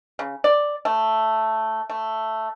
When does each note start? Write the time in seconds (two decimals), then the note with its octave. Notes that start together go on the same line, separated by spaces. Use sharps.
0.19 C#3
0.44 D5
0.85 A3
1.90 A3